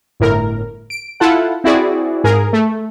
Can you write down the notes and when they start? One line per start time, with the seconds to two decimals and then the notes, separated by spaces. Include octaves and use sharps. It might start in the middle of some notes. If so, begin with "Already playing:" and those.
0.20 G1 A2 A#4
0.90 D7
1.20 E4 F4 A4 F#5
1.64 C4 E4 F#4 G#4 D5
2.24 G#2 G#4 A#4
2.53 A3